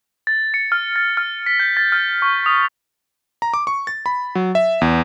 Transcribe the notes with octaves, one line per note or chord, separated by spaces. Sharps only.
A6
C#7
F6
A6
F6
B6
G6
A6
F6
C#6
D#6
A#5
D6
C#6
A6
B5
F#3
E5
E2